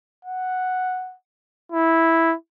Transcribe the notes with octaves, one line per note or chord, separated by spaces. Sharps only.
F#5
E4